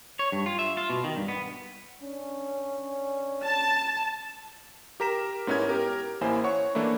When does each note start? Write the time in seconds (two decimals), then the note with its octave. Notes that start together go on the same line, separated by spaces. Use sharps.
0.19 C#5
0.32 G2
0.46 F4
0.59 E5
0.77 F4
0.90 B2
1.04 D#3
1.17 G2
1.28 B3
2.01 C#4 D4
3.43 A5
5.00 G4 A#4 A#5 B6 E7
5.47 G#2 B3 C#4 E4 A#4 G#6
5.69 G4 A#4
6.21 A1 A#3 E4 C5 G#5
6.44 C#5 F#5 C#6
6.75 E3 A3 A#3 D4 E4